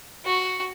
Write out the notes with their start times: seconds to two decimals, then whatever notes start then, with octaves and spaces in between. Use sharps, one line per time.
0.25 F#4